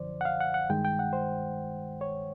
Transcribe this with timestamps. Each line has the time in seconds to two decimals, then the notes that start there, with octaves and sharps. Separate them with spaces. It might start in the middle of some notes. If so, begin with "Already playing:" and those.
Already playing: F#2 D3 F3 C5 D5
0.21 F#5
0.25 F5
0.40 F#5
0.54 F#5
0.70 G2 D#3 G#3 G5
0.85 G5
0.99 F#5
1.13 C5
2.01 C#5